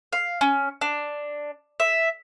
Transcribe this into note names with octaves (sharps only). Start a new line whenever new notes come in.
F5
C#4
D4
E5